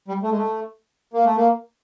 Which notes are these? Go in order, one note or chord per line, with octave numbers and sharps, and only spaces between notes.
G3
A3
G#3
A3
A#3
A3
A#3